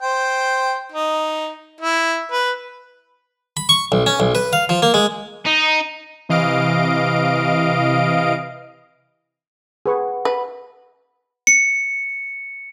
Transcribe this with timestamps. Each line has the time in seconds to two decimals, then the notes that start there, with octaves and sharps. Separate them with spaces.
0.02 C5 G5
0.92 D#4
1.81 E4
2.32 B4
3.57 B5
3.69 C#6
3.92 B1
4.06 C#4
4.20 B1
4.35 B4
4.53 F5
4.69 F3
4.83 A#3
4.94 G#3
5.46 D#4
6.29 C3 E3 D#5 F5 D7
9.86 G#4 B4 F#5 C#6
10.25 B4 B5
11.47 C#7